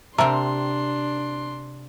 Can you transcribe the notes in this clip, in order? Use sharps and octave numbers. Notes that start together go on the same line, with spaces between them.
C3 C4 D4 A#4 E5 A5 C6